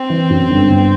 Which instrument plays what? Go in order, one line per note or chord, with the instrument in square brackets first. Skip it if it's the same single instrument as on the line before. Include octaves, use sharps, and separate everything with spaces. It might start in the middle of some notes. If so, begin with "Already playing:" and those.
Already playing: [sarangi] C4
[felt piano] E3
F#2
G1
G1